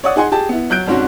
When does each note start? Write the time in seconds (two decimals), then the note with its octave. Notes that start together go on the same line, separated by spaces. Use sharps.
0.04 C#5 D5 F#5 D#6
0.16 D#4 G#4 F#5 G#5 C6
0.32 G4 G#4 A5
0.49 B3 E4
0.70 F#3 F#6 G6 D7
0.86 C2 F2 G#2 C#4 F#4